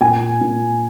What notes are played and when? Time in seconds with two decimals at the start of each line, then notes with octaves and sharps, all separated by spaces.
0.01 A#2 G#5
0.41 A#2